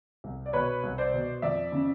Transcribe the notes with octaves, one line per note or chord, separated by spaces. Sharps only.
C2
D5
B2 B4 C#5
C2
C5 D5
B2
F2 D5 E5
C#3